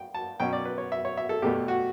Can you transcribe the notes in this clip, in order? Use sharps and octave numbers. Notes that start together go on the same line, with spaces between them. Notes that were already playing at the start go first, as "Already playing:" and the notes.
Already playing: G5
A5
B2 F#3 C#4 G5
D5
B4
C#5
E5
C#5
E5
A4
E2 B2 A3 G4
F#4